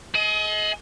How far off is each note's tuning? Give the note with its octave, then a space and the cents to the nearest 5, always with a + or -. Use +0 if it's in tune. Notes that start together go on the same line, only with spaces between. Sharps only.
G#4 +40 D#5 +25